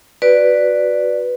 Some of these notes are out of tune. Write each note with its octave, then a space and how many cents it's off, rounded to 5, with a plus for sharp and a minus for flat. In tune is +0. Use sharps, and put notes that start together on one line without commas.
F#4 +0 B4 +0 D5 +0